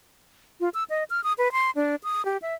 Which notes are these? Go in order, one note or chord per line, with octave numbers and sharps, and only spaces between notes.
F4
E6
D#5
F6
D#6
B4
C6
D4
D#6
G4
E5